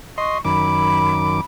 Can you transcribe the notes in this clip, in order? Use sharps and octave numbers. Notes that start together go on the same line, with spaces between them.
D#5 C6 C#6
F#2 D#3 B5 D6